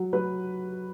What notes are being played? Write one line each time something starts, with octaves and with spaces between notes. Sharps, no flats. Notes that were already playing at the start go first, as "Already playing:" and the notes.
Already playing: F#3
F#3 B4